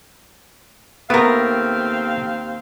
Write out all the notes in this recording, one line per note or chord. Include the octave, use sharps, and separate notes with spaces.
D#2 A3 B3 C4 A#4 F5